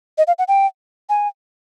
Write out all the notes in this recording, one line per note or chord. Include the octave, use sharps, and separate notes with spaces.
D#5
F5
F#5
G5
G#5